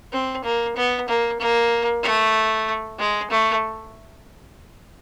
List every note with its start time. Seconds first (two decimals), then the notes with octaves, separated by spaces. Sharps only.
0.13 C4
0.44 A#3
0.77 B3
1.09 A#3
1.40 A#3
2.03 A3
2.99 G#3
3.31 A3